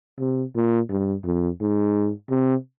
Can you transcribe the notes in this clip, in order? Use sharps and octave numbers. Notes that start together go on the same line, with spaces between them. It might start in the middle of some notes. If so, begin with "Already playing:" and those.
C3
A#2
G2
F2
G#2
C3